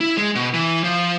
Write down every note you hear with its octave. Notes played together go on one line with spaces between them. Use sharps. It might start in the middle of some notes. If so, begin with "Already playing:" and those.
E4
G#3
B2
E3
F3